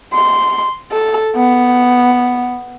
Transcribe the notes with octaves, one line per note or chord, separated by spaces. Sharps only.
C6
A4
B3